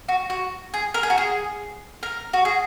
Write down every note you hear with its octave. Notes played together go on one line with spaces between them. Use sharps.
F#4
F#4
G#4
A#4
G#4
F#4
G#4
A#4
F#4
G#4